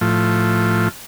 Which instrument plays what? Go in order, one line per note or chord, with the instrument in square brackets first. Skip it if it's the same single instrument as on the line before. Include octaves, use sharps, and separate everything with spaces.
[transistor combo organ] A2 F3